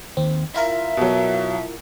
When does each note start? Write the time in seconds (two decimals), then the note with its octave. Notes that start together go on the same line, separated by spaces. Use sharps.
0.17 D#2 C4
0.54 E4 F4 A#4 E5
0.97 B2 F#3